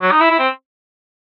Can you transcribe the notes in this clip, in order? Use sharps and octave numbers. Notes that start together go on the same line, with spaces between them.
F#3
D#4
E4
E4
C4